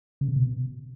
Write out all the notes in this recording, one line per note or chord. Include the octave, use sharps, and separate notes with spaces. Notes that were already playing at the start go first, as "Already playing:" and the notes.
C#3
C3
B2